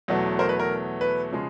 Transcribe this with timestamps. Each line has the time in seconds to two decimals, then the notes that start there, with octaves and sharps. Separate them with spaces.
0.08 E2 B2 F#3 A3
0.39 A#4 C5
0.49 B4
0.60 A#4
1.01 B4
1.32 C#3 F3 G#3